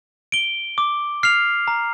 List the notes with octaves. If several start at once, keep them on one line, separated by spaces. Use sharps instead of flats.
D7 G7
D6
F6 C7 F7
A#5